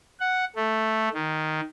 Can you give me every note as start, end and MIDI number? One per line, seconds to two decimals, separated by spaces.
0.20 0.44 78
0.56 1.09 57
1.14 1.61 51